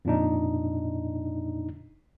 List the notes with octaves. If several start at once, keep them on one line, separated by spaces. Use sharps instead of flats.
F2 A#2 D4 D#4